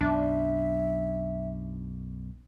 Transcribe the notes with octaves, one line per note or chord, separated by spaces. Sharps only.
B1 F#2 D4 E5